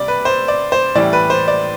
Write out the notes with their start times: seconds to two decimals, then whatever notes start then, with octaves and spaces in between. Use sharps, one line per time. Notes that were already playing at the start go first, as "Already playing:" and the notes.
Already playing: C3 G3 D5
0.08 B4
0.25 C5
0.48 D5
0.72 C5
0.95 A2 E3 G3 D5
1.13 B4
1.30 C5
1.48 D5